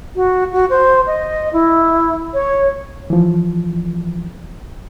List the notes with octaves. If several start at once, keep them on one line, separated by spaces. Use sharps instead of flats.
F#4
F#4
C5
D#5
E4
C#5
E3 F3